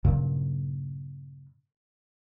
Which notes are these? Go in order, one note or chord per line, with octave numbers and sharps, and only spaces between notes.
G2 A#2 C#3 F#3